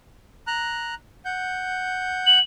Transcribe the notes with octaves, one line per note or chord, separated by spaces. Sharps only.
A#5 F#6
F#5 G6
F#7